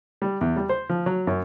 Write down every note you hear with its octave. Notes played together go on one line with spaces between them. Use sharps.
G3
E2
G3
C5
F3
F#3
F#2